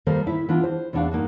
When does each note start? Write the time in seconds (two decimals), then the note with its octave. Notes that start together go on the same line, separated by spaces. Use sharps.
0.06 D#3 G3 A#3 A4 A#4 C5
0.27 A2 E4 E5
0.49 E3 B3 D4 F4
0.64 C5
0.93 E2 G3 A3 D4 F#4 F5
1.11 G2 A#3 D#4 F#4